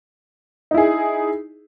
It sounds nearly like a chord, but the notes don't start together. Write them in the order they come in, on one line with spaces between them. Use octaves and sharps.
D#4 E4 G#4